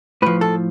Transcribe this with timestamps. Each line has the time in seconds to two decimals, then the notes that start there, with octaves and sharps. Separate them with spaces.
0.22 A2 F3 B4
0.41 A4